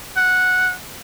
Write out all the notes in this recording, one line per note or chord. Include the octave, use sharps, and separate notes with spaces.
F#5